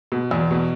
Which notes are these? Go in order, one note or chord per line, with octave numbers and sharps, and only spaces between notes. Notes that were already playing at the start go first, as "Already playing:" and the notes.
B2
E2
B2